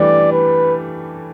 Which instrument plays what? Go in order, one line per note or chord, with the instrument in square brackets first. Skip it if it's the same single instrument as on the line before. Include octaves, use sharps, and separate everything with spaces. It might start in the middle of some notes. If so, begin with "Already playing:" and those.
Already playing: [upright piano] E3 G3 A3 D4 [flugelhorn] D5
[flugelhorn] B4